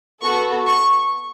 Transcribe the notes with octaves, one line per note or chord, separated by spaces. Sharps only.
B3 F#4 A4 C#6
C#6